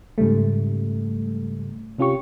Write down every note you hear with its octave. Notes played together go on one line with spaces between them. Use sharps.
G#2 C#3 G3 A3
C3 C#4 F4 G4 C#6